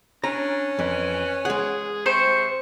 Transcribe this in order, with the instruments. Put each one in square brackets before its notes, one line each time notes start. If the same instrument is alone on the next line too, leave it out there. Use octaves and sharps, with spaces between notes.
[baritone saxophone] C#4 [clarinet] D4 [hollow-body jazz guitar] A#5
[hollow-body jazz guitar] F2 [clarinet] E3
[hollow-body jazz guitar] G#3 F#5 [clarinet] G#4
[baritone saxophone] C3 [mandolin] C5 [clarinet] C#6